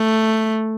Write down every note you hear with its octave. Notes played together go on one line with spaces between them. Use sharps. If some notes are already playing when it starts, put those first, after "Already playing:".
Already playing: A3